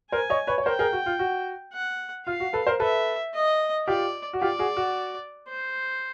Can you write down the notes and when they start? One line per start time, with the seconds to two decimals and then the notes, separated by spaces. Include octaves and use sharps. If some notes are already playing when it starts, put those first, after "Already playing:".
0.12 A#4 C5 G#5
0.30 C#5 D#5
0.47 B4 C#5
0.58 C#5
0.66 A#4 C5 G5
0.79 G#4 A#4
0.93 F#4
1.06 F4
1.19 F#4
1.73 F#5
2.27 F4 F5
2.40 F#4
2.53 A4 B4
2.67 A#4 C5
2.80 A4 B4 E5
3.34 D#5
3.87 F4 G4 D5
4.33 F#4
4.41 F4 G4 D5
4.59 F#4 G#4
4.77 F#4
5.49 C5